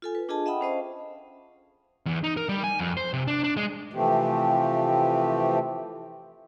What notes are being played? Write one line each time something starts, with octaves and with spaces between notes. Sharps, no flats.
F4 A4 G#5
B4
D4 F4 G#4 D#5 G#5 A5
D#5 E5 F#5 G5 B5 D#6
C#4 C5 D#5 F5
E2
D#4
A#4
G3
G#5
F2
C5
C3
D4
D4
G#3
C3 E3 F3 A3 C4 G4